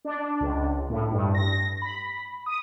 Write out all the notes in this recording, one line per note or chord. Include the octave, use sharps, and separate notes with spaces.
D4
C#2
A2
G2
A#6
B5
D#6